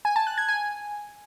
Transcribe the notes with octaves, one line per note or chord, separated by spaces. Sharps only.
G#5
A5
F#6
G#6
G#5